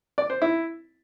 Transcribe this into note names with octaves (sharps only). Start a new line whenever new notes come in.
D5
C5
E4